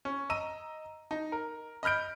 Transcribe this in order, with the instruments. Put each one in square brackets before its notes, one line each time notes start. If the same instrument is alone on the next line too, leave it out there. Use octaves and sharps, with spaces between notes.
[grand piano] C#4
D#5 A#5 E6 D#7
D#4
A#4
D#5 B5 F6 G6 D7